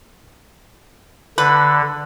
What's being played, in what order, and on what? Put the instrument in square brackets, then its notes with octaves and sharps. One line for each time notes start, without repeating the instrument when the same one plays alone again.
[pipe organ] D3 [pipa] B4